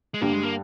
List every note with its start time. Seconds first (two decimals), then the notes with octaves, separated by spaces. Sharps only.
0.14 G#3
0.21 G2 D3 G3 A#3
0.33 G#3
0.43 A#3